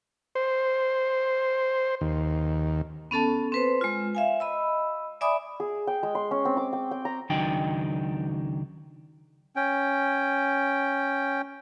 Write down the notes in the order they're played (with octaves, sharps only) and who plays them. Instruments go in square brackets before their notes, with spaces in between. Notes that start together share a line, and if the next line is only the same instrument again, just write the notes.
[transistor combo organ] C5
D#2
[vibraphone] B3 C#4 A4 A5
C4 B4 C5
G#3 F4
E5 F5 G#5
D#5 B5 E6
D5 E5 G#5 B5 D6 D#6
[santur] G#4
G5
G#3
C6
C#4
C4
D6
G5
G5
A#5
[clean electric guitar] C#2 D#3 F#3 D4 D#4 G5
[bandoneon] C#4 G5